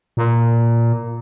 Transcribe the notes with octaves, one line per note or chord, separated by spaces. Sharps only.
A#2